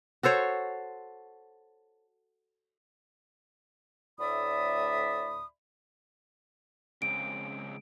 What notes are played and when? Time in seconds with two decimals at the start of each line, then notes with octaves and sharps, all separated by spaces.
0.23 F#4 A4 C5 C#5
4.20 D2 A2 D5 E5 B5 D#6
7.02 C#3 G#3 C4 D7